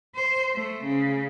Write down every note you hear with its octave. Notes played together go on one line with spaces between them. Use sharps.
C5
A3
C#3